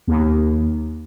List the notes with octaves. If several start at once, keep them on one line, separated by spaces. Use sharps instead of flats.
D#2